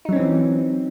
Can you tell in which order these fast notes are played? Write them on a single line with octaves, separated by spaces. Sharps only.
D#4 F#3 C#4 C4 E3